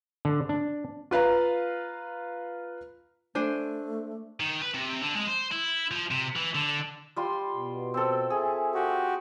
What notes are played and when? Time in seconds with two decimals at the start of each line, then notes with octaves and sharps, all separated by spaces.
0.25 D3
0.49 D4
1.11 F4 B4 F5 A#5
3.35 A3 D4 C5 G#5
4.40 D#3
4.62 B4
4.75 C3
5.02 D3
5.16 G#3
5.28 C5
5.52 E4
5.91 F3
6.11 C3
6.36 E3
6.55 D3
7.16 G3 F4 C6
7.56 B2
7.94 C4 A4
8.30 G#4 A4 E5 G#5
8.74 F#4 G4